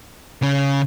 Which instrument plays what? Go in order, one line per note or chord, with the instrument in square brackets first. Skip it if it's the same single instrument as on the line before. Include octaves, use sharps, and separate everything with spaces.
[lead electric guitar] C#3